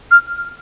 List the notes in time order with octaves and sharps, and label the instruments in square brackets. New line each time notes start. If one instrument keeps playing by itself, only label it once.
[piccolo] F6